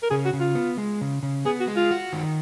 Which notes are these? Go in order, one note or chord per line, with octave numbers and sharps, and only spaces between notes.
A#4
C#3 G#4
F#4
C#3
F4
B3
G#3
C#3
C#3
B3 G#4
F#4
G#3
F4
F#4
D#3